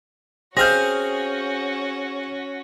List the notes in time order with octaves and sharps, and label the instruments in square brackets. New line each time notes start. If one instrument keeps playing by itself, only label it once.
[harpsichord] C4 F5 [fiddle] C#4 F#4 [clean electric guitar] G#4 [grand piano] G6 A#6